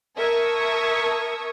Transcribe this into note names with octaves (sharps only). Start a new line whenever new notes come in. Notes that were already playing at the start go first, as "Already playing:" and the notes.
A#4 E5 A5 C#6 D#6 G#6